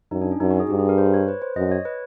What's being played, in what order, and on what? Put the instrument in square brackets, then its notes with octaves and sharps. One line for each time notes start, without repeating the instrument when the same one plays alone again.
[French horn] F#2 [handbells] D#4
[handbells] D4
C#4
[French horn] F#2 [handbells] D#4
[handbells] F#4
G#4
[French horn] G2 [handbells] G4
[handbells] G#4
A#4
C5
C#5
B4
C5
[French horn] F#2 [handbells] D#5
[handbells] C#5
B4